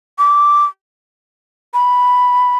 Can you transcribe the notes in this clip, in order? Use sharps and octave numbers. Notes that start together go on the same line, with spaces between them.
D6
B5